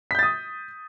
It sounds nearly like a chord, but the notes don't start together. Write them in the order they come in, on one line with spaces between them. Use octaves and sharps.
B6 G6 A6 D#6